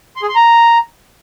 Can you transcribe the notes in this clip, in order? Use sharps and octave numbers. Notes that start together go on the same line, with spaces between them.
C6
G#4
C6
A#5